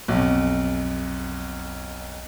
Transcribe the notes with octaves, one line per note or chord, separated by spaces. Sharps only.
B1 F2